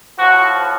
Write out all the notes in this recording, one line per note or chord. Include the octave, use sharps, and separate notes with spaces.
A2 F3 F#4